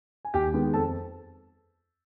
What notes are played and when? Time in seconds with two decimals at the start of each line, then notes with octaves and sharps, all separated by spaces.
0.25 G#5
0.34 D#2 G4 G5
0.54 D#3 G#3 B3
0.74 F2 A4 A5